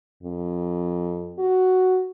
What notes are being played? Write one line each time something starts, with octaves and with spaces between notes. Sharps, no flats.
F2
F#4